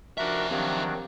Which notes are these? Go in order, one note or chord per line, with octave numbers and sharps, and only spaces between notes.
F3 D4 F#4 A#4 E5
D#3 F#3 C4 D4 G4 F5